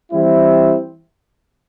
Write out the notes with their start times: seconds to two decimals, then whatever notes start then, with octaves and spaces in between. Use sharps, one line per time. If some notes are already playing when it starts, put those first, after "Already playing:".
0.11 E3 G3 C4 E4